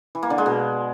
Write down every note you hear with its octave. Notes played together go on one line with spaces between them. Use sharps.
E3
A#3
D3
G#3
B2